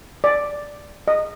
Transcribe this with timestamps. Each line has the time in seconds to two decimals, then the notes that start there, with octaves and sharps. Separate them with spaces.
0.24 D5
1.08 D#5